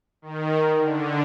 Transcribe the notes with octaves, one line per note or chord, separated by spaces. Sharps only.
D#3
D#3
D3